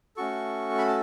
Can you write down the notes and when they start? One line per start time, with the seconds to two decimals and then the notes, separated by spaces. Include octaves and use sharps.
0.17 A3 C#4 F#4 A4 C#6
0.78 B5
0.87 A5